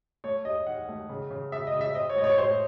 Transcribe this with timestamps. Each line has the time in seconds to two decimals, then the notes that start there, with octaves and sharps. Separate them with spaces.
0.24 A3 C#5
0.45 D#2 D#5
0.67 D#3 F#5
0.88 A3
1.09 C#3
1.31 C#3
1.52 C#3 E5
1.67 D#5
1.74 C#3
1.81 E5
1.95 C4 D#5
2.09 C#5
2.16 A2 D#5
2.24 C#5
2.38 A2 C5